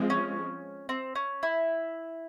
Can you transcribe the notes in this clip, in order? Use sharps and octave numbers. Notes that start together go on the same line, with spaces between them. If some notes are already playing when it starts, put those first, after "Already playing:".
Already playing: F3 G#3 C4
C#4
C4
C#4
E4